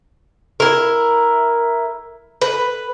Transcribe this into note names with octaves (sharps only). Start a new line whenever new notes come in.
E4 A#4
B4